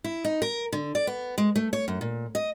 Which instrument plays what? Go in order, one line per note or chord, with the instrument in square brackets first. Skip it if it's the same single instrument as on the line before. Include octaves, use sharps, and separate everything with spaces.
[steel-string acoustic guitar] E4
D#4
A#4
D3
D5
B3
G#3
A3
C#5
F#2
A#2
D#5